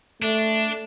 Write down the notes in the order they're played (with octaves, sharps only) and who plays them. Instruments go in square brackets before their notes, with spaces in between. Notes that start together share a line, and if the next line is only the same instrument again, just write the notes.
[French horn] A3 [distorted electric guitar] D4